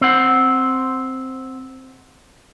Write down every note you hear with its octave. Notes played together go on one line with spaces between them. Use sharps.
C4 F#5